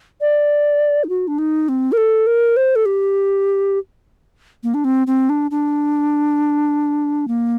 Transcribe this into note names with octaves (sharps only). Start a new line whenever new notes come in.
D5
D#4
F#4
D4
D#4
C4
A#4
A4
A#4
C5
A4
G4
A#3
D4
C4
C4
D4
D4
A#3